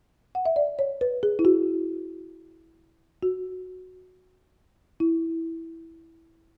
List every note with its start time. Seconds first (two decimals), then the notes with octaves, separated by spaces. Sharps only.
0.35 F#5
0.46 E5
0.56 D5
0.79 C#5
1.01 B4
1.23 G#4
1.39 E4
1.45 F#4
3.23 F#4
5.00 E4